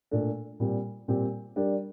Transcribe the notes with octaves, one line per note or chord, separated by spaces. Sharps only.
A#2 A3 D4
A#2 G3 C4 G4
A#2 G3 C4 G4
G3 D4 G4 A#4 D5